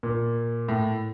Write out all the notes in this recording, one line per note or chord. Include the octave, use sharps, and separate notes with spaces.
A#2
A2